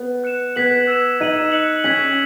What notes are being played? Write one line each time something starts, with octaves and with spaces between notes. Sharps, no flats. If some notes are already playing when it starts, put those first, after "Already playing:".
Already playing: B3
F#6 C#7 E7
B3 G#6 B6 F#7
E6 G#6 B6 E7
D#4 G#6 D#7 F#7
F#6 C#7 F#7
C#4 G#6 B6 F#7